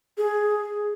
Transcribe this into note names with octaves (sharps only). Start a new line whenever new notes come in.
G#4